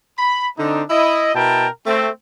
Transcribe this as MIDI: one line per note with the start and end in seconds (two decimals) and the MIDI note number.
0.19 0.47 83
0.58 0.83 50
0.58 0.83 60
0.58 0.83 62
0.58 0.83 63
0.89 1.31 64
0.89 1.31 75
1.34 1.67 47
1.34 1.67 64
1.34 1.67 70
1.34 1.67 79
1.34 1.67 81
1.87 2.09 57
1.87 2.09 60